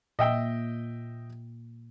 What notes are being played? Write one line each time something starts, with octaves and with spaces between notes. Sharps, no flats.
A#2 D#5 E5 G5